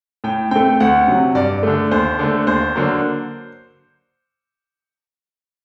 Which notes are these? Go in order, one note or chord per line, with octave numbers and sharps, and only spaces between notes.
A2 G5
A3 C4 G5
D2 F#5
C3 F#3
G2 D5
D3 A3
D#2 C5
D3 A3
D#2 C5
D3 F#3 A#3